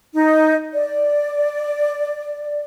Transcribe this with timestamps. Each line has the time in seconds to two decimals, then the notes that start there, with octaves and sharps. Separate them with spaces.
0.14 D#4
0.73 D5